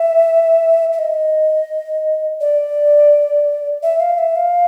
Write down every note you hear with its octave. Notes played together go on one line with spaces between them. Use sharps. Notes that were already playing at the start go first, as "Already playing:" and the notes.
Already playing: E5
E5
D#5
D5
E5
F5
E5
F5